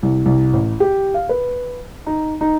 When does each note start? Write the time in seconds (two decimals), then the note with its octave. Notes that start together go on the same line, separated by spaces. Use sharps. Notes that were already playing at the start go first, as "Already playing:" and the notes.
0.03 C2
0.26 C2
0.53 A1
0.80 G4
1.14 F5
1.29 B4
2.06 D#4
2.41 D#4